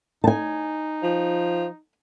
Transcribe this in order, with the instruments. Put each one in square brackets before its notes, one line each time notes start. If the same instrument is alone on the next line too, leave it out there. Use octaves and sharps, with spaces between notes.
[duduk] D#4 [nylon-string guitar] G#5 A5
[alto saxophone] F3